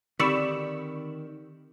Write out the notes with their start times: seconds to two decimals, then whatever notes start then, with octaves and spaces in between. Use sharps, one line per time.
0.19 D3 D#3 C4 G4 D5 B5 C#6 E6